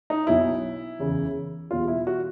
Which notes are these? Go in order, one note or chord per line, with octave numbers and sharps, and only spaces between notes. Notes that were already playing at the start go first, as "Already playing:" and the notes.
D#4
B1 B2 F#3 E4
F#1 E2 C#3 E3
E2 B2 G3 F4
E4
F#4